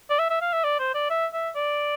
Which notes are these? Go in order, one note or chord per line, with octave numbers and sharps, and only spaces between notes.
D5
E5
E5
F5
E5
D5
C5
D5
E5
E5
D5